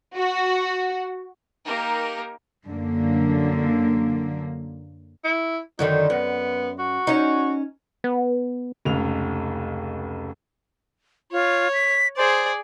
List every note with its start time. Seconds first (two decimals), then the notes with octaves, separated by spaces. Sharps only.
0.17 F#4
1.65 A#3 D#4 G4 A#4
2.67 F#2 D3 A#3
5.24 E4
5.79 F#2 D3 D#3 D#4
6.10 F#2 B3
6.79 F#4
7.07 C#4 D#4
8.04 B3
8.85 F1 C#2 F7
11.32 F4 C#5
11.73 B6
12.17 G#4 C5 D5